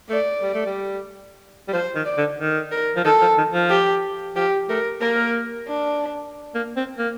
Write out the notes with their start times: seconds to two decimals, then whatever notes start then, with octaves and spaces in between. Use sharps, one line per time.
0.09 A3 D5
0.42 G3
0.54 A3
0.66 G3
1.68 G3
1.73 F3 C5
1.95 D#3
2.06 D5
2.17 D3
2.39 D#3
2.72 A#4
2.96 F3
3.04 D#3 A4
3.21 F3
3.38 D#3
3.53 F3
3.70 G4
4.36 F3 G4
4.69 A3 A#4
5.01 A#3 A#4
5.67 D4
6.55 A#3
6.76 C4
6.98 A#3